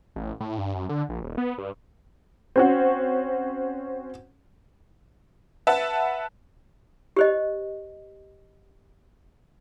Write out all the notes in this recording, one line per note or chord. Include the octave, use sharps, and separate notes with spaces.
A1
A2
G2
F#2
D3
A#1
D#1
B3
G2
C4 C#4 F#4
B4 E5 F#5 A5
G4 C5 D#5